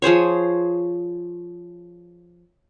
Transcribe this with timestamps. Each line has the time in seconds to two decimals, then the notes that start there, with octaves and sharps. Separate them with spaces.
0.02 F3 G#4 C5 C#5